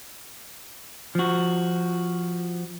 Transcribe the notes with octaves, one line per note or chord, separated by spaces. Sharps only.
F3 F#4